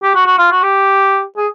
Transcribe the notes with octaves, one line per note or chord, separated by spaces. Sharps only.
G4
F#4
F#4
F4
F#4
G4
G#4